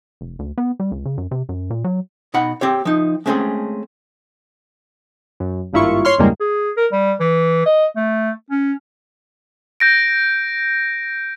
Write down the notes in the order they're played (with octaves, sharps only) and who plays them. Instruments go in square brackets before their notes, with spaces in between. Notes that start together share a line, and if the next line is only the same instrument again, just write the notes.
[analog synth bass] F1
D2
B3
G3
C#2
C#3
F#2
C3
F#2
A#2
F#3
[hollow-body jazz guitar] B2 D#4 F#5 B5
C4 G4 C#5
F3 D#4
G#3 A3 C4 C#4 G#4 A4
[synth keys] F#2
G#1 G2 A#3 E4 F4 C#6
C#5 C6 F6
E2 G2 C#3 G3 G#3 A#3
[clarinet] G#4
A#4
G3
E3
D#5
A3
C#4
[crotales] G6 A#6 D7